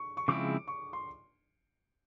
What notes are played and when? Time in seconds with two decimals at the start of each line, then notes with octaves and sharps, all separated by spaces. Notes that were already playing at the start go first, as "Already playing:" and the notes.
Already playing: C#6
0.17 C#6
0.28 C#3 F3 G#3 C4 E4 D6
0.68 C#6
0.93 C6